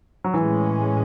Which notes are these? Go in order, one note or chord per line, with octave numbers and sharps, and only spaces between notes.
F#3
A2 E3 G#3 C#4